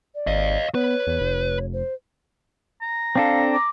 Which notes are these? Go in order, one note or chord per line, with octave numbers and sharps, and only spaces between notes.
D5
G#1 D#5 F5
B3 B4 C#5
E2
F1
C5
A#5
C4 D4 A4 F5
D6